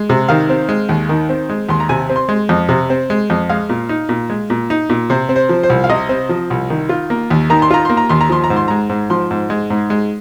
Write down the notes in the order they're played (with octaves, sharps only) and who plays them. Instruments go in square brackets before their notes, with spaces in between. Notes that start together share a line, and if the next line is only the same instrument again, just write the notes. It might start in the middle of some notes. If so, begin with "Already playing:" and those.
Already playing: [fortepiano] G#3
C3
D#3 F5
C4
G#3
D#2
D#3
C4
G#3
D#2 C6
A#5
C3 G#5
C4
C6
G#3
F2
C3
C4
G#3
F2
G#3 F5
A#2
D#4
A#2
G#3
A#2
D#4
A#2
C3 C5
C4
C5
F3
C5
C2
F5
C3 D#5
C4
F3
C2
D#3
F4
A#3
D#2
D#3 A#5
C6
F4 A#5
A#3 C6
A#5
D#2 C6
A#5
F3 C6
A#5
G#2
C6
G#3 A#5
G#2
F3 C6
G#2
G#3
G#2
G#3